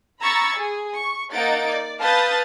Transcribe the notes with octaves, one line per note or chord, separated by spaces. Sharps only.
A#5 B5 C#6 E6 G#6 A6
G#4
C#6
A#3 D#4 F#5 A6 D7
D5
B4 F5 A5 D#6 G6 A6